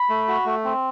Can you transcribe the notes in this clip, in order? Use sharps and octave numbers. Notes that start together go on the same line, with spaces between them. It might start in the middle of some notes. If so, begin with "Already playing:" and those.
Already playing: B5
A3
F#4
A3
C4